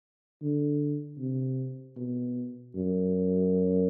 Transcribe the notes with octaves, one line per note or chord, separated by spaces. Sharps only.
D3
C3
B2
F#2